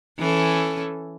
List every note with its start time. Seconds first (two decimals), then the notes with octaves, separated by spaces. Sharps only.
0.19 E3 C#4 A4